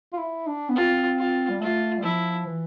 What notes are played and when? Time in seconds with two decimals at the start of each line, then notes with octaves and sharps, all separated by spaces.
0.13 F4
0.19 E4
0.47 D4
0.69 B3
0.75 C4 F4
1.18 F4
1.49 G3
1.61 A3 F4
1.98 G3
2.03 F3 E4
2.46 E3